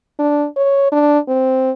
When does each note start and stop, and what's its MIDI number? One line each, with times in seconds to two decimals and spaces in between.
0.19 0.46 62
0.57 0.87 73
0.92 1.19 62
1.28 1.71 60